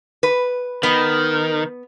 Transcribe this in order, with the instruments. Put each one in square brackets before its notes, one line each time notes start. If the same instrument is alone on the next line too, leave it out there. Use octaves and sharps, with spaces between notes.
[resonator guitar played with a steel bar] B4
[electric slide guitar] D#3 [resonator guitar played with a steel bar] B3